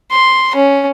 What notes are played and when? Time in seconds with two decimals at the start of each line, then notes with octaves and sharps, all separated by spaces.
0.11 C6
0.55 C#4